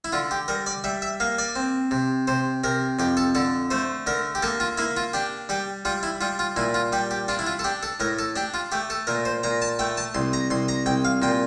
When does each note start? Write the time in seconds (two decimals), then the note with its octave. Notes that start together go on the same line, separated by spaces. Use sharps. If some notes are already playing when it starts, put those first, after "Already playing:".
0.05 E4
0.12 D3 F4
0.31 G4
0.48 G3 A#4
0.66 D5
0.84 G3 E5
1.02 E5
1.20 A#3 F5
1.38 D5
1.55 C4
1.91 C3
2.27 C3 C5
2.64 C3 A#4
2.99 F2 G4
3.17 A4
3.35 D3 A4
3.71 A3 C5
4.07 D3 A#4
4.35 G4
4.43 A#3 A4
4.60 F4
4.78 A#3 E4
4.97 F4
5.14 D4 G4
5.49 G3 G4
5.85 G3 F4
6.03 E4
6.21 G3 F4
6.39 F4
6.56 A#2 E4
6.74 F4
6.92 G3 G4
7.11 G4
7.28 D4 F4
7.39 E4
7.47 F4
7.59 A4
7.64 D4 G4
7.83 A4
8.00 A2 A#4
8.19 A4
8.36 D4 G4
8.54 F4
8.72 A3 G4
8.90 A4
9.07 A#2 A#4
9.25 C5
9.43 A#2 A#5
9.62 A5
9.79 A3 G5
9.97 A5
10.14 C2 C6
10.33 A#5
10.51 C2 C6
10.68 A#5
10.86 C2 G5
11.05 F5
11.22 A#2 G5